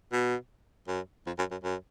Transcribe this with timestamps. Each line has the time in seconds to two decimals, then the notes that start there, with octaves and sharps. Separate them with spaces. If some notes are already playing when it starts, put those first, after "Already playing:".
0.12 B2
0.88 F#2
1.26 F2
1.38 F#2
1.51 F#2
1.64 F#2